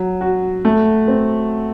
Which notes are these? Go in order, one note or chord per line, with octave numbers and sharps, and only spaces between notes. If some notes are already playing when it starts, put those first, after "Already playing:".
Already playing: F#3
F#4
A3
C4